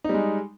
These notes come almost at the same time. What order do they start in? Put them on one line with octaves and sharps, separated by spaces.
D#4 G3 G#3